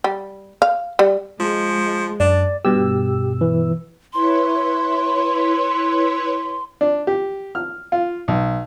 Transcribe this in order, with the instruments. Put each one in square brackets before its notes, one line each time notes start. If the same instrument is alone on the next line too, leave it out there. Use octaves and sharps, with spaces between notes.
[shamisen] G3
F5
G3
[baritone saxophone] F3 [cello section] G#3
[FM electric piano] F#2 [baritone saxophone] D4 [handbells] D5
[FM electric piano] G2 B2 E6 [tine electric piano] G4
[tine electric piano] E3
[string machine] E4 B4 C#5 [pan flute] C6
[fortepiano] D4
G4
F6
F4
B1